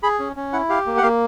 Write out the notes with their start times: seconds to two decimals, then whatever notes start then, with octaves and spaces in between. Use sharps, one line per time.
0.03 G#4 B5
0.19 C#4
0.36 C#4
0.53 E4 F#5
0.69 G4 F5
0.86 A#3
0.98 F#5
1.02 A#3 F5